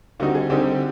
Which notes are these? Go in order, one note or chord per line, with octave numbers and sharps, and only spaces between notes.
D3 G3 C4 D#4 F#4
G#4
D3 G3 C4 D#4 G4